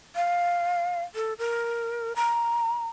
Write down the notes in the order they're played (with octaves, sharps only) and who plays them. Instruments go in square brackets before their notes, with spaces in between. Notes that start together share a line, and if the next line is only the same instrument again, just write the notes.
[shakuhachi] F5
A4
A#4
A#5